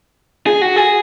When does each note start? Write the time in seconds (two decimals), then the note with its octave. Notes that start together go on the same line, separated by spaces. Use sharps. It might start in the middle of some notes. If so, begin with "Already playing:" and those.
0.47 G#4
0.62 F#4
0.76 G#4